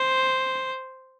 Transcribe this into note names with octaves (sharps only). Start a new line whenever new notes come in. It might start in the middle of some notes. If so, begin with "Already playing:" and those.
Already playing: C5